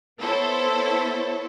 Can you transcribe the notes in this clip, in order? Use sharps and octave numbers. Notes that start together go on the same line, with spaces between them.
B3 E4 A4 C5 C#5